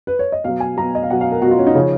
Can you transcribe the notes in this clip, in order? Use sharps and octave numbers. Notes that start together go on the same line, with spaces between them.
B4
C#5
D#5
B2 F#3 F5
G#5
B2 F#3 A#5
D#5
F5
B2 F#3 F#5
F5
A#4
B2 F#4
F#3 F4
C#4
D#4
C#3 F3 C#4